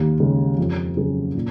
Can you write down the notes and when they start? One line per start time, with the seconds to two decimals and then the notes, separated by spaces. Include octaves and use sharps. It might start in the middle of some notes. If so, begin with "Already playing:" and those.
Already playing: D#2
0.20 C#3 G#3
0.58 F2
0.97 C#3 F#3 C#4 G#4
1.35 A#2